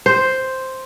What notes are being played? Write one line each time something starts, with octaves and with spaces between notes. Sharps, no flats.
C5